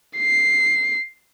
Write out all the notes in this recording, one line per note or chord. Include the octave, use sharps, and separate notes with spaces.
C7